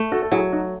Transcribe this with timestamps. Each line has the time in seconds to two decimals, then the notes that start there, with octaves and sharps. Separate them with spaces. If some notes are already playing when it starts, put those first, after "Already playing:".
Already playing: A3
0.12 F#4 A4
0.22 A4
0.32 F#3 E4 G#4
0.53 D#4 F#4